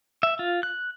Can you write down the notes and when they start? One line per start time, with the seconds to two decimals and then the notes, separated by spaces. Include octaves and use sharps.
0.23 E5
0.39 F4
0.63 F#6